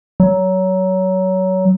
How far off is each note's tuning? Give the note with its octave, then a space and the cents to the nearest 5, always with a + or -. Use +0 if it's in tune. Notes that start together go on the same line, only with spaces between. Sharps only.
F#3 +20